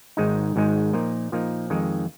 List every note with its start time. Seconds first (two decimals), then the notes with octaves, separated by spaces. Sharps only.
0.17 G#1 G#2 G#3 D#4
0.56 G#1 G#2 G#3 D#4
0.93 A#2 F3 A#3 D#4
1.32 A#2 F3 A#3 D#4
1.70 F2 D#3 G#3 D#4